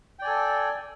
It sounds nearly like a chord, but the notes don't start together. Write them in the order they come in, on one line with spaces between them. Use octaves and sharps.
G5 D5 G#5 A4